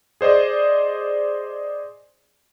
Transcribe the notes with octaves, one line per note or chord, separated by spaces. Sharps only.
G#4 C5 D5 D#5